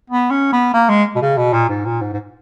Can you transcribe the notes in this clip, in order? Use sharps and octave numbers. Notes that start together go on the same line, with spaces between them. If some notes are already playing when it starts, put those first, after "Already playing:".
B3
C#4
B3
A#3
G#3
B2
C#3
B2
A#2
G#2
A#2
G#2
G#2